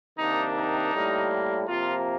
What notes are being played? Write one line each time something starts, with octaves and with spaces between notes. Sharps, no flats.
C3 D#3 A#3 D4 D#4
D#4
A2 G3 A#3
C3 F3 A#3 F4